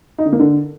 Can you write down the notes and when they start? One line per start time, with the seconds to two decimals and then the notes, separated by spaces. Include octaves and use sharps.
0.18 D#4
0.25 D3
0.32 A#3
0.39 D3